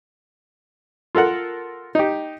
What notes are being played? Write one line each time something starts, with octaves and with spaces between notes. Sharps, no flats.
F4 A4 A#4 F#5
D#4 G4